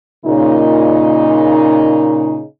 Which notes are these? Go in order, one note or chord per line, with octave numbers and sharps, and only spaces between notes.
A#2 C#3 D#4